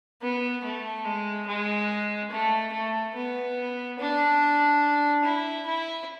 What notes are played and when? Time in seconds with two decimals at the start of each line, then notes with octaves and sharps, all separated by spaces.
0.22 B3
0.64 A3
1.05 G#3
1.47 G#3
2.31 A3
2.73 A3
3.15 B3
3.99 D4
5.24 E4
5.66 E4